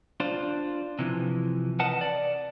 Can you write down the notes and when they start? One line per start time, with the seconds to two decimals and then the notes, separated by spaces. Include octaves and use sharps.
0.20 D4 F4 C5
0.99 C3 E3 F3
1.79 A#4 B4 D#5 F#5 A5
2.01 D5